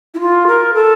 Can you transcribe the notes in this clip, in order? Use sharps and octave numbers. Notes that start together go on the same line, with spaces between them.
E4
F4
A#4
A4